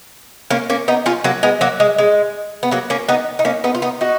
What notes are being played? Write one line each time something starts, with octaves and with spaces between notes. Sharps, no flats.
A#3 C#4
A#3 C#4
B3 D#4
C#4 F4
F#3 A#3
G#3 B3
F#3 A#3
G#3
G#3
B3
F#3 A#3
A#3 C#4
B3 D#4
D#4
A#3 C#4
B3 D#4
F4
B3 D#4
D#4 F#4